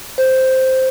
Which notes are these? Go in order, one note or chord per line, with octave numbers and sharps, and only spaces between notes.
C5